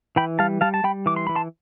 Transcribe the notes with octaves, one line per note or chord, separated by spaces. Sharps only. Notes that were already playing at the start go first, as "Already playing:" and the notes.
E3 G5 B5
G3 F5 A5
G3 F5 A5
A5
G3 G5 B5
E3 D6
C6
E3 B5
A5 C6